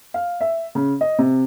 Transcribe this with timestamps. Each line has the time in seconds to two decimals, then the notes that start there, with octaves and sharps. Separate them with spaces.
0.14 F5
0.41 E5
0.75 C#3
1.01 D#5
1.18 C3